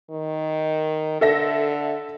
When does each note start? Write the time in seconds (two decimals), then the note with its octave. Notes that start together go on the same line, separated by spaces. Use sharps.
0.11 D#3
1.21 D3 A4 E5 A#6